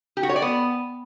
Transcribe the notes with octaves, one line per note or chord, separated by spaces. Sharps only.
G4
F#4
C#5
D5
B3